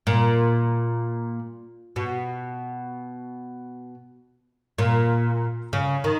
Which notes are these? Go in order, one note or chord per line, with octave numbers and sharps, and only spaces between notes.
A#2
B2
A#2
C#3
D#3